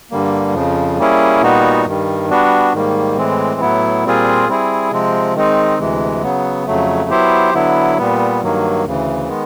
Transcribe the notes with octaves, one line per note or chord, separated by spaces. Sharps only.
G2 D3 G3 A#3
F2 C#3 F3
G3 A#3 C#4 E4 G#4
A#2 G3 B3 D#4 F#4
G2 D#3 G3
G3 B3 D4 F#4
G#2 D#3 G3 A#3
A2 E3 G#3 C4
A2 F#3 B3 E4
A#2 G3 C4 F4 G#4
G3 C4 E4 G#4
C3 F3 G#3 C4
D#3 G#3 C4 D#4
D2 C3 E3 G#3
C#3 F#3 B3
F2 C#3 F#3 A3
F#3 B3 E4 G4 C5
D3 F#3 B3 E4
A#2 G3 B3
G2 D#3 F#3 A#3
D2 C#3 E3
D#3 G#3 B3